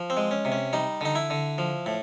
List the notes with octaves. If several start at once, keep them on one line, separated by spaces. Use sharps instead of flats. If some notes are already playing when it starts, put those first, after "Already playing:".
Already playing: F3
C4
G#3
C#4
C3
C#4
G3 D#4
D3 D#4
E4
D3
F3
A2